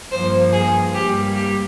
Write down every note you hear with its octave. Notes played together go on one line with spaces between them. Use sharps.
G2 F3 A#3 C5
G#4
G2 G3 A#3 G4
G4